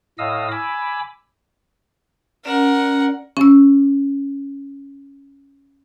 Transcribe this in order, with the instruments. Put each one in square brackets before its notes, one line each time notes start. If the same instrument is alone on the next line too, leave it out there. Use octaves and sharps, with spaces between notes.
[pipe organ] A2 D#5 F5 D#6 E6
G#5 B5 D6 E6
[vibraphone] C#4 D5 [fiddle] A#4 F#5
[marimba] C#4 E6